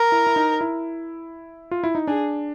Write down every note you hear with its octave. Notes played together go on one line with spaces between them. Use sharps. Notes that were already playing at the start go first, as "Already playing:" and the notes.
Already playing: A#4
E4
E4
D#4
E4
F4
E4
D#4
D4 G#4